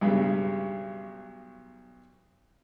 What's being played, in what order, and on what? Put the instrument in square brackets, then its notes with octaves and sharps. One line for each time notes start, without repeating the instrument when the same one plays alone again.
[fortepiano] B1 G2 C#3 G4